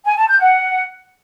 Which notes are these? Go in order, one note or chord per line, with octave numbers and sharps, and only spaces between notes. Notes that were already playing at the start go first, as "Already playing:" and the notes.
G#5
A5
G6
F#5